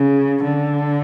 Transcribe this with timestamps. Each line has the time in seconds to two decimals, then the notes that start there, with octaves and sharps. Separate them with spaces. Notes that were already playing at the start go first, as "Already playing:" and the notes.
Already playing: C#3
0.44 D3